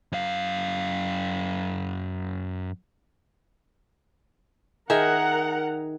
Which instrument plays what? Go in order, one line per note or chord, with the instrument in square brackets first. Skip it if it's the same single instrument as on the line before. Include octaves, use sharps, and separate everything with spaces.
[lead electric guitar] F#2 F5
[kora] D#3 G#4 E5 [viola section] A#4 F#5 A#5